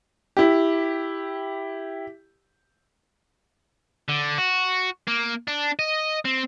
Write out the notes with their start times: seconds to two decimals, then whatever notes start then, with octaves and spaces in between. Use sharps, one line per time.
0.37 E4 G4
4.08 D3
4.38 F#4
5.07 A#3
5.47 D4
5.79 D#5
6.25 C4